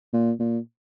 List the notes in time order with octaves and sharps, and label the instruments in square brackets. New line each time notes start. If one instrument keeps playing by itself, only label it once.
[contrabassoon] A#2
A#2